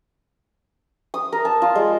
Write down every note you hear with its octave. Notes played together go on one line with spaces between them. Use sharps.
D#6
A#4
A5
F4
G#3